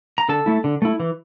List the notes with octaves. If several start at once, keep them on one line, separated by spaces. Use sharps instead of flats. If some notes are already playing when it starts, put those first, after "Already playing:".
A#5
D3 A4 A5
A3 E4
D3
A3 E4
E3